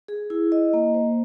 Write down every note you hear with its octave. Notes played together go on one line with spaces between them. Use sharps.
G#4
E4
D#5
A#3
C5